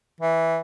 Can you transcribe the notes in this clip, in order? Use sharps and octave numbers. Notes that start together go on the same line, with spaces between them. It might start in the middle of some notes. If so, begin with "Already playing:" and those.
E3